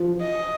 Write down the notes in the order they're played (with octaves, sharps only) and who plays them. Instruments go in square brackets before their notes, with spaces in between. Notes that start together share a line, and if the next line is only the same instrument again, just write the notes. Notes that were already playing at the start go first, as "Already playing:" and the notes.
Already playing: [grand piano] F3
[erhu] D#5